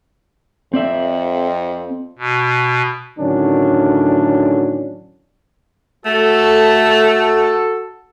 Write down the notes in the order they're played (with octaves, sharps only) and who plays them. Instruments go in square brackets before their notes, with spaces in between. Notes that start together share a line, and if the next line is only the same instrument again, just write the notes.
[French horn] F2 [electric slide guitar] C4 D5 E5
[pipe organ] B2
[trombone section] A2 D3 D#3 F#3 C#4 D4
[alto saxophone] A3 [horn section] F#4 A4